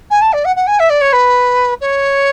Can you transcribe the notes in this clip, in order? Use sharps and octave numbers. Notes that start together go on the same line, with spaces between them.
G#5
A5
D5
F#5
F#5
G#5
E5
D5
C#5
B4
C#5